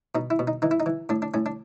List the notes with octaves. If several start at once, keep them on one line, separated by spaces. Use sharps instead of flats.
B2 D#4
E4
B2
D#4
E3 D#4
E4
D#4
E3
A2 D4
D4
A2 C#4
D4